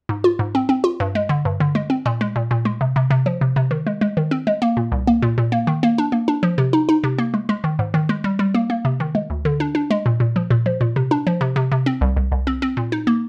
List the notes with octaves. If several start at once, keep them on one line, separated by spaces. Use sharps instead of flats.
G#2
F4
G#2
C4
C4
F4
G2
G#3
D3
G2
D3
G#3
C4
A#2
G#3
A#2
A#2
G#3
C3
C3
C3
F3
C3
C3
D#3
G#3
G#3
D#3
C4
G#3
A#3
A#2
C2
A#3
A#2
A#2
A#3
D#3
A#3
D4
A#3
D4
F3
C3
D#4
D#4
C3
A#3
G#3
G#3
D#3
G#2
D#3
G#3
G3
G3
A#3
A#3
C3
D#3
G#3
D2
D3
D4
D4
G#3
A#2
A#2
F3
A#2
F3
A#2
C3
D4
F3
C3
C3
C3
C4
C2
C2
C2
C4
C4
A#2
D#4
A#3